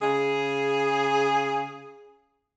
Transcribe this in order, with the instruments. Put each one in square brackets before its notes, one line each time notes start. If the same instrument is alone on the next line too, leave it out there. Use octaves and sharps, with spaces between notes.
[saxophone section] C#3 G#4